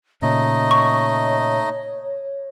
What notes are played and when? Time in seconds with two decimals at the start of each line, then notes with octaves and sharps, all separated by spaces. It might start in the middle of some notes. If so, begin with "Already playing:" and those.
0.22 A#2 C#3 A3 D#4 C#5 D#5
0.71 C#6